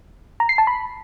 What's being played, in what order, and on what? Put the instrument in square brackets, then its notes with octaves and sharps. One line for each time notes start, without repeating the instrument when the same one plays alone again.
[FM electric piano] A#5
C7
A5
B5